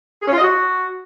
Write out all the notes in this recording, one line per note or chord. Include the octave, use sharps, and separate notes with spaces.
G#4
C#4
F4
D#5
F#4